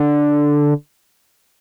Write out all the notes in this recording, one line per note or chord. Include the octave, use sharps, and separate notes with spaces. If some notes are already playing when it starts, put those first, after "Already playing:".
Already playing: D3